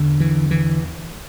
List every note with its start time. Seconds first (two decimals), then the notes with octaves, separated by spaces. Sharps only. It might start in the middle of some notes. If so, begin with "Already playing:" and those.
Already playing: E2 D3
0.20 E3
0.51 E3